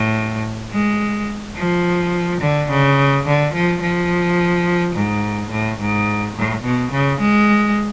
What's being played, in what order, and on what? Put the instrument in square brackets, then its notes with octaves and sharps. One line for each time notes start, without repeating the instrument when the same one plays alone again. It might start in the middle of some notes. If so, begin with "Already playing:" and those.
Already playing: [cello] A2
G#3
F3
D3
C#3
D3
F3
F3
G#2
A2
G#2
A2
B2
C#3
G#3